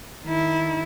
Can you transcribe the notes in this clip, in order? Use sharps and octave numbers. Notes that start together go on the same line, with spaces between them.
D#3 E4